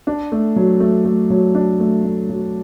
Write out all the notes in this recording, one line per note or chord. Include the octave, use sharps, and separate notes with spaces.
D4
A3
F#3
A3
A3
F#3
D4
A3
A3
F#3